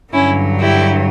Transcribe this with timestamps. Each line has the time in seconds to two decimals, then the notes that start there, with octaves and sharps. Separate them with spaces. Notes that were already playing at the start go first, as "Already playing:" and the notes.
0.13 G2 D3 F#3 C#4 E4
0.60 E4 G4